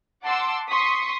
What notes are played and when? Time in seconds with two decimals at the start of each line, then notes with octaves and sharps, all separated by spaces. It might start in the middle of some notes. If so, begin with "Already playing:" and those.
0.23 F#5 A5 C6 D6 E6
0.70 C6 C#6 D#6 B6